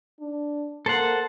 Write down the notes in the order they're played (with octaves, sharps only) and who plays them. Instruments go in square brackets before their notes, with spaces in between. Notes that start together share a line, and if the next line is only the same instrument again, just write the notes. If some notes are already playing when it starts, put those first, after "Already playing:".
[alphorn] D4
[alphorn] A#3 [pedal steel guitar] A4 C5 F#5